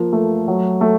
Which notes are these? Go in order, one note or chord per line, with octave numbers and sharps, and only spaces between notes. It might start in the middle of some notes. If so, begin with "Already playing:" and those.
Already playing: F3 A#3
A3
F#3
A3